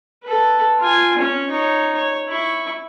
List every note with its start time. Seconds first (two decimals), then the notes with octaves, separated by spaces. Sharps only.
0.24 A4 B4
0.80 F4 G#5
1.18 C#4 C#5
1.50 D#4 C#5
1.96 C#5
2.28 E4 C#6